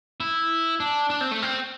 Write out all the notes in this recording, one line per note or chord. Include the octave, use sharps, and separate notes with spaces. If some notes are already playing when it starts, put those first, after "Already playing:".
E4
D4
D4
C4
A3
C4